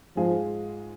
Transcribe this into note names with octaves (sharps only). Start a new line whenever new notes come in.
G#2 F3 G#3 F4 G#4